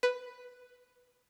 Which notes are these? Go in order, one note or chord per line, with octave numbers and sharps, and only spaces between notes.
B4